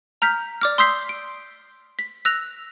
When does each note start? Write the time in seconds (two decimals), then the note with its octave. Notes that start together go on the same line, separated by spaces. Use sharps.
0.22 A#5 F6 G6 B6
0.61 D5 D6 F6
0.78 C6 D#6 E6 G6 B6 C7
1.09 D7
1.99 B6
2.25 E6 F#6 A#6 F7